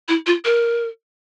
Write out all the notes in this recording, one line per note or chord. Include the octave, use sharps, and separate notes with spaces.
E4
F4
A#4